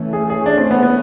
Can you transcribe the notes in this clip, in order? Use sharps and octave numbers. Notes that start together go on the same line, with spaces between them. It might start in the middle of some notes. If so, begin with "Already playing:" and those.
Already playing: E3 A3 C#4
G#4
G#4
D4
C4
B3
B3